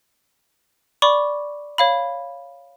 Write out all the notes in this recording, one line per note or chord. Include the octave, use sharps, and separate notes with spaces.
D5 B5 C#6 D6
C#5 F5 B5